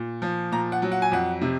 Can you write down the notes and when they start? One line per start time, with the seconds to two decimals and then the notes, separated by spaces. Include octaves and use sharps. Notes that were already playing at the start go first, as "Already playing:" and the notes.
Already playing: A#2
0.22 F3
0.52 A#2 A#5
0.72 F#5
0.82 F#3
0.92 F#5
1.02 G#5
1.11 F2 F#5
1.41 C3